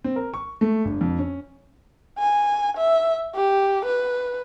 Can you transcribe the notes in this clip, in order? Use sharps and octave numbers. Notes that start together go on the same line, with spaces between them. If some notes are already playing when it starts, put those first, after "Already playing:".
C4
A#4
C#6
A3
G1
F2
C#4
G#5
E5
G4
B4